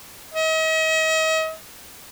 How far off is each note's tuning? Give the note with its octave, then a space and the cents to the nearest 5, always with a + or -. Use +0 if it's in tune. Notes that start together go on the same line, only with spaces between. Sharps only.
D#5 +40